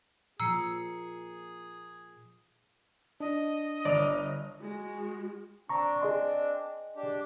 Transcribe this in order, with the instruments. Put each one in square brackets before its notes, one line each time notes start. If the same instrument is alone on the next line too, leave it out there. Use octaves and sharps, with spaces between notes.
[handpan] A#2 F3 [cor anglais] G#4 [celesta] A#5 C7 C#7 [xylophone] E6
[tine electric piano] D4 [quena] D#5
[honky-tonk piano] G1 D#6 F7 [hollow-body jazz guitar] D5
[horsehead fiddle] G#3 F#4
[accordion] C4 D4 [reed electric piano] A#5 C#6
[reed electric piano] G#4 D#5 C6
[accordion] D4 G4